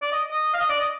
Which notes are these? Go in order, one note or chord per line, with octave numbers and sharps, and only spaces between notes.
D5
D#5
D#5
F5
D#5
D5
D#5